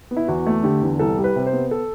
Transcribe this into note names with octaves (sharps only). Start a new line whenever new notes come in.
B3
E4
E2 F#4
A3
D3 G4
E2
C2 A4
G3
B4
C3
C5
B3
A4